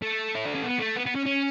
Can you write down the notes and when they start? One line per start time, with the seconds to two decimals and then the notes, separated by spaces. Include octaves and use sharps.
0.02 A3
0.35 E4
0.45 D4
0.55 C#4
0.64 B3
0.80 A3
0.96 B3
1.06 B3
1.15 C#4
1.26 C#4